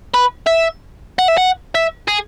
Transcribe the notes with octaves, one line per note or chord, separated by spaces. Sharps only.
B4
E5
F#5
E5
F#5
E5
G#4